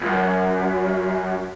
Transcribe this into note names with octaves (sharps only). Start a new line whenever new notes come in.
C#2 F#2